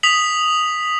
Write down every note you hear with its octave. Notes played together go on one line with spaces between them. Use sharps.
D#6 B6 F7 F#7